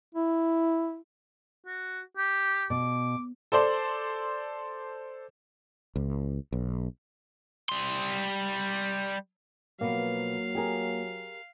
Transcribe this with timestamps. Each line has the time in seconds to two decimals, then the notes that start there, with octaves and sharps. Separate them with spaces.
0.15 E4
1.66 F#4
2.17 G4
2.70 B2 D6
3.52 A4 C5 D5 C6
5.96 C#2
6.52 B1
7.69 G3 C6
9.81 B2 F3 F#3 A#3 B3 F5
10.55 G4 G#4 A#4